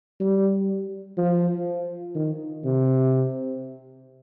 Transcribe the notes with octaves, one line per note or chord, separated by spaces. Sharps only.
G3
F3
D#3
C3